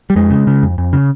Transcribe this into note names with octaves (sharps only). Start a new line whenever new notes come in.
G3
F2 G#3
C#3
C#3
F2
F2
C#3